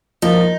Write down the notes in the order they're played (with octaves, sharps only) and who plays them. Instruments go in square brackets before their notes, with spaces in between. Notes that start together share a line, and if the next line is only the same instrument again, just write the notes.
[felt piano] F3 A#3 F4 [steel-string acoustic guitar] D#4